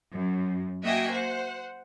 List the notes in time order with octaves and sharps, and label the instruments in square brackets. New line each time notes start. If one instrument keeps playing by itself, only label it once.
[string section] F#2
A#3 F#4 D#5 E5 G5 G#5
C5 F#5